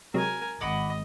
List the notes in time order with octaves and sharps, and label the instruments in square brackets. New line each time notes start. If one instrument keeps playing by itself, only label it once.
[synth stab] C3 F#3 G#3 [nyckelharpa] A#4 G#5
[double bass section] G#1 [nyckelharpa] D#5 [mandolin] F#5 B5 D6